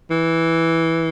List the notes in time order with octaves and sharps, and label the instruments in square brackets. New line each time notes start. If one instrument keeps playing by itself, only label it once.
[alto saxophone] E3